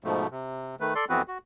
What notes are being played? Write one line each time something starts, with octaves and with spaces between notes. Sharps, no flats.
G#2 B2 F3 A3
C3
D#3 A3 B4
A4 D5 C6
F2 E3 B3 C4 F#4 B4
F#4